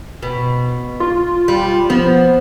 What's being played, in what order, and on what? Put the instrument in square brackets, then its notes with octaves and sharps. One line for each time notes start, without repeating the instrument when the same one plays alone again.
[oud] B2
[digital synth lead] F4
[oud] G3
[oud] F3 [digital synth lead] B3